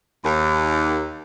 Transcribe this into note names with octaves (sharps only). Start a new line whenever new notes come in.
D#2